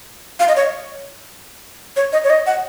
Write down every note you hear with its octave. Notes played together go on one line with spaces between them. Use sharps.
F5
D#5
C#5
C#5
D#5
C#5
D#5
F#5